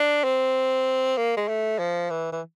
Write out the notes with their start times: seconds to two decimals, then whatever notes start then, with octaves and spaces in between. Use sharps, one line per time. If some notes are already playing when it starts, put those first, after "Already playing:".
Already playing: D4
0.24 C4
1.17 A#3
1.37 G#3
1.48 A3
1.79 F3
2.10 E3
2.32 E3